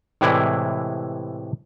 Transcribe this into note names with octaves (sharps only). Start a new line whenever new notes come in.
A2 C3 E3 G#3 E4 D5